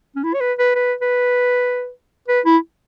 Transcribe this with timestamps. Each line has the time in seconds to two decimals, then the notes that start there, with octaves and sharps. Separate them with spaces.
0.16 C#4
0.24 E4
0.34 C#5
0.41 B4
0.59 B4
0.75 B4
1.01 B4
2.28 B4
2.45 E4